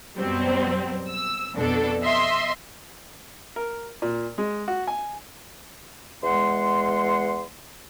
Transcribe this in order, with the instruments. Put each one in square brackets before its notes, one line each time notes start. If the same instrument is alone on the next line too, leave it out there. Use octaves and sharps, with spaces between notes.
[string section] F#2 B2 F#3 G3 C4
E6
F2 B2 D4 A4
D#5 E5 C6
[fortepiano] A#4
A#2
G#3
F#4
G#5
[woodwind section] E2 G#3 F#5 C6